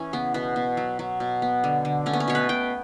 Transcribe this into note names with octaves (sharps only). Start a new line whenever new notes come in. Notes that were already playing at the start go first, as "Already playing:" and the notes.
Already playing: E3 C#4
C#3 B3
B2 B3
B2
F#3
F#3
B2
B3
D3
D3
A3 C#4
B3
C#4
B2 C#5
B4
B2 G5